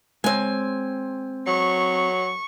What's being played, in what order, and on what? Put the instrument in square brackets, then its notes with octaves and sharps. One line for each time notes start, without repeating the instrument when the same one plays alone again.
[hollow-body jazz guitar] G#3 C#5 [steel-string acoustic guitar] C4 G#5
[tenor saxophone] F#3 [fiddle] C#6